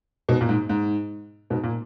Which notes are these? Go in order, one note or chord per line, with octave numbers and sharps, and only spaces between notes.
G#2 B2
A#2
G#2
G#2
G#2 B2
A#2